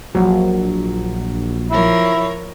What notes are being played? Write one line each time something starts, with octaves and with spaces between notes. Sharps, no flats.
A#1 F#3
F3 E4 A#4 C#5